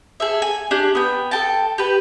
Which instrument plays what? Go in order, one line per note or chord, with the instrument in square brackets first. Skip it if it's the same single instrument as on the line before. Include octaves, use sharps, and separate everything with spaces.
[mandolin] G#4 A4 E5
G#5
D4 G4 G#4
B3 G5
A4 G5 A5
G4 B4